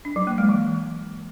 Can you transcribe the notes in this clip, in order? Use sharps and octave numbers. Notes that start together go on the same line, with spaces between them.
D4
F#3
A#3
G#3
E3